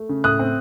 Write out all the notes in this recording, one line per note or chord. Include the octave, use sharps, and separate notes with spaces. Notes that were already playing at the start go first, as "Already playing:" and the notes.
Already playing: A3
C#3
A2 D#6 F#6
C4